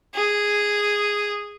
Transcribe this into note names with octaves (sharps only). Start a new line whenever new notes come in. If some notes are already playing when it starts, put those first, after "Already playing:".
G#4